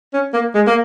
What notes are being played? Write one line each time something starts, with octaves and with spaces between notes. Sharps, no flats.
C#4
A#3
G#3
A#3